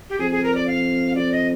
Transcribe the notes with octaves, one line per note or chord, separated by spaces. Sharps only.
G4
F2 G#4
G#4
A#4
D5
F5
F2 D5
D#5